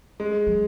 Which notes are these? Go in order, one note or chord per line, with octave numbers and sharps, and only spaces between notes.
G#3
F#3